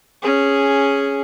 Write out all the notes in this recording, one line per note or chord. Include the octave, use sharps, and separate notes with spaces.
C#4 G#4